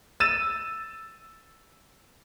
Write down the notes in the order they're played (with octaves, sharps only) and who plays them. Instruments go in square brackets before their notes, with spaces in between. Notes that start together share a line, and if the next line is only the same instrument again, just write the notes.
[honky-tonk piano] E6 A6 D#7 E7